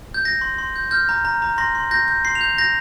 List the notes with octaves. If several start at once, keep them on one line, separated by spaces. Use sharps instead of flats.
G6
G6 A#6
C6
C6
G6
F6 G6
A#5
A#5
A#5
C6 A#6
C6
G6 A#6
G6
C6 C7
F7
G6
G6 A#6